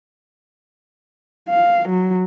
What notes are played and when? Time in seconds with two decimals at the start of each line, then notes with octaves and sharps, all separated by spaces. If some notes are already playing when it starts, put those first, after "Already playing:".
1.49 F5
1.89 F#3